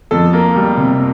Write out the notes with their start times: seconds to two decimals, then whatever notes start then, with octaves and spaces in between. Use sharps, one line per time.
0.11 F2 A4
0.33 A#3
0.56 G3
0.77 C3